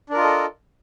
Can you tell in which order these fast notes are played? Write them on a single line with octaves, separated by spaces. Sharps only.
D4 A#4 F4 D#5 A4